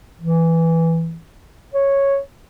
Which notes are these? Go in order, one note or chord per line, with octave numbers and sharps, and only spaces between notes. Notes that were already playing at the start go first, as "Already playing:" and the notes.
E3
C#5